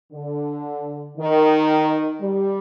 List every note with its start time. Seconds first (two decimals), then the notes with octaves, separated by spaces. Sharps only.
0.13 D3
1.18 D#3
2.22 G3